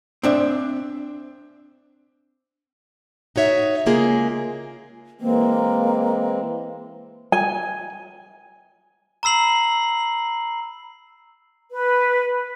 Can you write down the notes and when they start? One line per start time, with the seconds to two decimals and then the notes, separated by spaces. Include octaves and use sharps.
0.23 C4 D4 E5
3.36 D#4 F#4 C#5 E5
3.86 C#3 G#3 A#3 F4 G#4
5.21 E3 G#3 A#3 C4
7.32 G#5
9.23 A#5 B5 E6 C7 F#7
11.71 B4